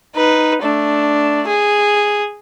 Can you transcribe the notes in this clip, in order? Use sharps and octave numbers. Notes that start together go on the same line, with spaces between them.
D#4 B4
A3 D4
G#4